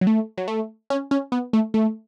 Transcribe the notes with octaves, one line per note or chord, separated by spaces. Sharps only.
F#3
A3
F#3
A3
C#4
C#4
B3
A3
A3